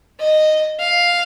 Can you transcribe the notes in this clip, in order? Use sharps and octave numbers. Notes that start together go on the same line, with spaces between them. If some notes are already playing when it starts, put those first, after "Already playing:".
D#5
F5